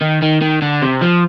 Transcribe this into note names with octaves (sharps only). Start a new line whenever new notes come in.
D#3
D#3
D#3
D3
C3
F3